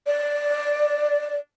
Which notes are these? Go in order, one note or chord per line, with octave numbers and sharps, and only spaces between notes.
D5